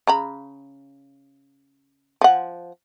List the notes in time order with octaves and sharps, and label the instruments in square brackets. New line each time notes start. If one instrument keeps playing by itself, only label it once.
[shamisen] C#3 A#5 B5
F3 F#5